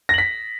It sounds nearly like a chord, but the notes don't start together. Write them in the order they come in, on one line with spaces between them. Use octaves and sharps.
A#6 F#7 B6